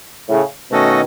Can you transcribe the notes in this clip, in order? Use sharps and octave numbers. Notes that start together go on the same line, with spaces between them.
A2 C#3
B2 D#3 A3 C#4 F#4 A4 D#5